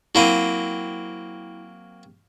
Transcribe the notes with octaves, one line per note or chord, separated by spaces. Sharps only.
F#3 A#3 C4 E4 B5 D#7